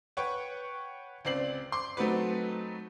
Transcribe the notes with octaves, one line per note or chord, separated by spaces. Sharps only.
B4 C#5 F#5 G5 C#6
C#2 C4 D5 C7 F#7
C6 D6
F#3 A3 C4 D#4 F#4 B4